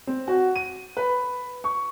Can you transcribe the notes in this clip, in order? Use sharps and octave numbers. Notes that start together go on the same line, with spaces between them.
C4
F#4
D#7
B4
C#6